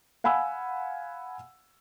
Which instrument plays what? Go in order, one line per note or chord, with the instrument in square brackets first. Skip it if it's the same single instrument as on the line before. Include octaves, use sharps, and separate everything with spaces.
[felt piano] F5 F#5 G#5 B5 E6